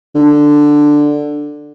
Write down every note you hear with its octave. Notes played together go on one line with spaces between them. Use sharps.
D3